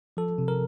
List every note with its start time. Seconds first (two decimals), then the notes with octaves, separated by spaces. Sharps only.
0.17 F3 A4
0.38 C3
0.48 A#4